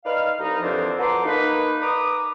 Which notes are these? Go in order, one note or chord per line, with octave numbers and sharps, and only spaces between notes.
D#4 B4 D5 F5
C2 D#4
F2 D3 E3 F3 C4 D4
F#4 A4 B4 A#5 C6 D6
A#3 D#4 B4
B4 A#5 D6 D#6